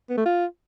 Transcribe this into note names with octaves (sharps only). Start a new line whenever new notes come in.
B3
A3
F4